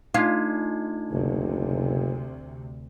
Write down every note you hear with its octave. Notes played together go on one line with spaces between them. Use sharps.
A3 D4 D#4 F4
F#1 D2 C3